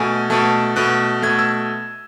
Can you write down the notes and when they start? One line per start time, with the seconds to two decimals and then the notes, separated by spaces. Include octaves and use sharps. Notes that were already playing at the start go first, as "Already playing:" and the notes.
Already playing: B2 A3 G#5
0.30 B2 A3 A5
0.76 B2 A3 F#6
1.22 B2 A3 G#6
1.39 E6